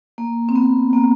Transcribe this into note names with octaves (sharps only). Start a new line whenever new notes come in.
A#3
C4
B3
A#3